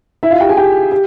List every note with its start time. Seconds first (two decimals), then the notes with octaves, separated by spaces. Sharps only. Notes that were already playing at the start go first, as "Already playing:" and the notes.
0.23 E4 E5
0.31 F4 F5
0.40 G4 G5
0.49 G#4 G#5
0.57 G4 G5
0.92 G4